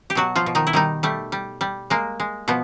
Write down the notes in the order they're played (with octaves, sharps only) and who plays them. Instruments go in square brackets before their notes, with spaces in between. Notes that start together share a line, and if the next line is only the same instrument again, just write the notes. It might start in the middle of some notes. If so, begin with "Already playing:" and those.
[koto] G4
B2 F#3 F#4
F3 F4
B2
D#3 D#4
E4
D#3 G3 D#4
G3 A3
G3
G3
G#3 A#3
G#3
B2 F3 B3